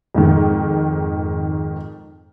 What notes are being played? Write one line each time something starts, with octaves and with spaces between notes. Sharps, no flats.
F2 G#2 D#3